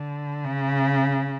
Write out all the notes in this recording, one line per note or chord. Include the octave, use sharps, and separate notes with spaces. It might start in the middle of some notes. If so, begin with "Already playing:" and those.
Already playing: D3
C#3